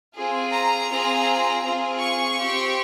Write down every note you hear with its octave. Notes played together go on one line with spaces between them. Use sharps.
C4 F4 G#4
A#5
C4 F4 G#4
C4 F4 G#4
C#6
C4 G4